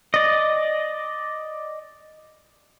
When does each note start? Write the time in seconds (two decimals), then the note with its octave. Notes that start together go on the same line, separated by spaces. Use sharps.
0.14 D5 D#5